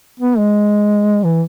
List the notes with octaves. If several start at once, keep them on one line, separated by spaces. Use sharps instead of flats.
B3
G#3
E3